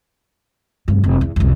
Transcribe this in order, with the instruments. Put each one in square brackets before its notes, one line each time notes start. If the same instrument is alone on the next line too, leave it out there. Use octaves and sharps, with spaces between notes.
[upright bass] F1 G2
F1
E2
C2 F2